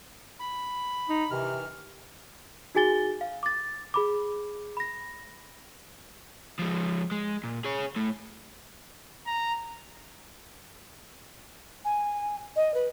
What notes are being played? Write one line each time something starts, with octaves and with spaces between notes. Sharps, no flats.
B5
D#4
C3 D#3 E3 F6
D#4 F#4 G#4 G#5 A6 G7
F5
D6 A6
G#4 B5 D6
B5 A#6
F3 G#3
G#3
A#2
G#4 C#5
A2 A3
A#5
G#5
D#5
B4